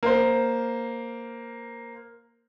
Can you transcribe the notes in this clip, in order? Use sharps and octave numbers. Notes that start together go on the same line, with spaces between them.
A#3 C5